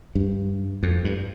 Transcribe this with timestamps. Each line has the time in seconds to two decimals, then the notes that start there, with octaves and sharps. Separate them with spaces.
0.15 G2
0.83 F2
1.04 G2